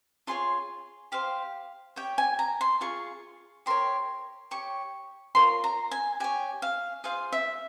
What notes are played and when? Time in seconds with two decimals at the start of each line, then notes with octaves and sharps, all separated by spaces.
0.27 F4 G#4 C#5 C6
1.12 G4 C5 F5
1.96 G4 C#5 G5
2.18 G#5
2.39 A#5
2.61 C6
2.81 F4 G#4 C#6
3.66 G4 A#4 C#5 C6
4.51 G4 C#5 C#6
5.35 F4 A#4 C#5 C6
5.64 A#5
5.91 G#5
6.20 G4 C#5 G#5
6.62 F5
7.04 F4 G#4 C5 F5
7.32 E5